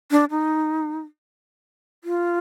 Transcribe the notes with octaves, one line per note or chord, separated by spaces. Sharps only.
D4
D#4
F4